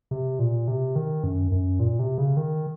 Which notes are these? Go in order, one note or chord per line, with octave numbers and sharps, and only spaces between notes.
C3
A#2
C3
D#3
F#2
F#2
A#2
C3
C#3
D#3